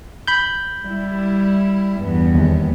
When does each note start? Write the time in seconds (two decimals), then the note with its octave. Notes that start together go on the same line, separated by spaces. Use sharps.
0.27 B5 G6
0.83 G3 E4
2.01 E2 G2 B3
2.35 D#2